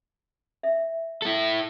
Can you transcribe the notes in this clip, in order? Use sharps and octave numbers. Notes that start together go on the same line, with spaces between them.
E5
E4 A4